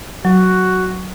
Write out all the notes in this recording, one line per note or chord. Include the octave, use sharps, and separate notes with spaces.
F#3 F#4